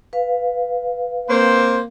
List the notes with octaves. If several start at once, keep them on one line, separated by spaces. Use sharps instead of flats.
B4 F5
A#3 C4 C5